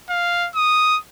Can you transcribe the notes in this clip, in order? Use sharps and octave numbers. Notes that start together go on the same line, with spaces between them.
F5
D#6